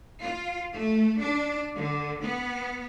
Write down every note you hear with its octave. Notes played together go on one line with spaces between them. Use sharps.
F4
A3
D4
D3
B3